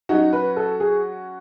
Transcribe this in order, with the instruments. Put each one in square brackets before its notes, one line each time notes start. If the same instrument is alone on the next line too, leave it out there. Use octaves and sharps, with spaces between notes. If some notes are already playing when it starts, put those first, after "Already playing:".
[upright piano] F#3 C#4 F#4 [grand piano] D#4
[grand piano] B4
A4
G#4